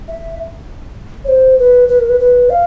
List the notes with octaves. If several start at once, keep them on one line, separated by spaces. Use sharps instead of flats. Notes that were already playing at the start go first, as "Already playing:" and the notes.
E5
C#5
C5
B4
B4
A#4
B4
B4
F5